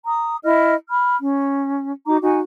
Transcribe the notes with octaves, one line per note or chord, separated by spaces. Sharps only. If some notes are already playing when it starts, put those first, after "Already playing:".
A#5 D#6
E4 D#5 F6
B5 F6
C#4
D#4 F#4 A#5 D6
D#4 F#4 G#5